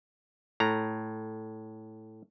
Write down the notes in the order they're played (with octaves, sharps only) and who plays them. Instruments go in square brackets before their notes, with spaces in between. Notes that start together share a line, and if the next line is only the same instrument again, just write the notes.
[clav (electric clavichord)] A2 A#5